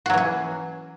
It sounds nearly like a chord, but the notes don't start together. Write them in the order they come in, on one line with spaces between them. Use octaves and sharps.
F#4 F#3 E3 C#4